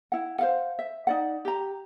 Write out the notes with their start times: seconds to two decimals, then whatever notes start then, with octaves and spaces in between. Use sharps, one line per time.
0.12 E4 F#5
0.39 C5 F5 F#5
0.79 E5
1.07 D#4 D5 F#5
1.45 G4 A#5